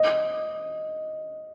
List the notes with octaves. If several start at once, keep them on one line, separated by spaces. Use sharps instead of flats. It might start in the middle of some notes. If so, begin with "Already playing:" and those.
Already playing: D#5